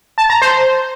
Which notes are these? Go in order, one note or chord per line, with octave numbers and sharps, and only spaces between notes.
A5
A#5
C5